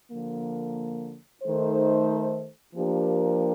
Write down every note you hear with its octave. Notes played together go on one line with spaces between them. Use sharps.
D3 F3 A#3
D#3 A3 D#4 A4 C5
F3 A#3 D4 G4 A#4